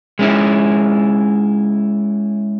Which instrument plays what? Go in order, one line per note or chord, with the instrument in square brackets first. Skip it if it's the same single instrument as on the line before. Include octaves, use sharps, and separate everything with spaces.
[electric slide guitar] G#3 C#4 E4